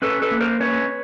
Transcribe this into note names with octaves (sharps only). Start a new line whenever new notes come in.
C#4 A4 B4
A4 B4
A#3
A#4 C5
C#4 B4 C#5